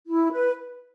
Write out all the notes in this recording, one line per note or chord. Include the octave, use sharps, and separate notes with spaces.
E4
B4